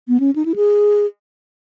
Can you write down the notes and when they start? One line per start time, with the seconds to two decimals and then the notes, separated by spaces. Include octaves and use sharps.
0.08 B3
0.20 C#4
0.36 D#4
0.45 E4
0.56 G#4